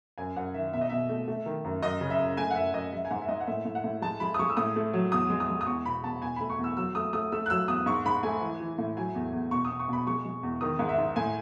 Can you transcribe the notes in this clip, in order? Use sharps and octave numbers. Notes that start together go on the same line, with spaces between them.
F#2 G#5
F#2 F#5
D#3 E5
B2 E5
D#5
B2 E5
A3
A3
D#3
F#2
F#2 D#5
C#3
E5
F#2
A3 G#5
F#5
F#2 E5
F#2 D#5
G#3 E5
G#5
G#2 F#5
E5
G#2 D#5
F#5
A2 E5
A2
F#5
A2
G#3 A5
G#3 B5
D#6
G#3 C#6
E6
A2 D#6
A3
F#3
E2 D#6
G#3
D#6
G#3
D#6
E2 C#6
B2 B5
E2 A5
B2 G#5
A3 B5
C#6
E2
E6
F#3 E6
A3 D#6
A3 D#6
A3 E6
F#6
F#3 E6
E2 D#6
G#2 C#6
G#2 B5
A3 G#5
E3
E3
A2
F#3 G#5
E2
E2
B2 C#6
D#6
B2
C#6
B2 B5
G#3 C#6
G#3
E2
D#3 D#6
G#2
E5
G#2
A2 G#5